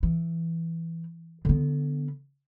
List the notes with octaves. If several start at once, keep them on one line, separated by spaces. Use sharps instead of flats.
E3
D3 B3